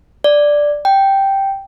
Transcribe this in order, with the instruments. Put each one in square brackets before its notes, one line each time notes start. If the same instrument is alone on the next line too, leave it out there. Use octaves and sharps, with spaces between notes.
[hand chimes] D5
G5